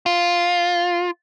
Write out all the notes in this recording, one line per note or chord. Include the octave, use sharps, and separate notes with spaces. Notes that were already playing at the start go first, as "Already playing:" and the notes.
F4